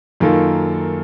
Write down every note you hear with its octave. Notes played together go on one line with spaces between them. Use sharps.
F#2 D#3 A#3 F4 A4